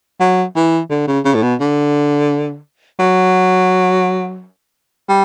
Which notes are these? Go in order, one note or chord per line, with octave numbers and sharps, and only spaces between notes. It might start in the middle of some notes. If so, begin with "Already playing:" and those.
F#3
E3
D3
C#3
C#3
A2
B2
D3
F#3
G3